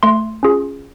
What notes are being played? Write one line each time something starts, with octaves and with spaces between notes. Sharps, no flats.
A3 C6
C#4 F4 G#4